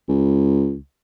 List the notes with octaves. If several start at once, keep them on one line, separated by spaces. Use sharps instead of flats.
C#2